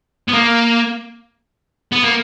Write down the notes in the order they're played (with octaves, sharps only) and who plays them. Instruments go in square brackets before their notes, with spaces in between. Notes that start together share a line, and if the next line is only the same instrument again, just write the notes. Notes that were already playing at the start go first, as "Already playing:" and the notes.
[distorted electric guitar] B3
A#3
B3
A#3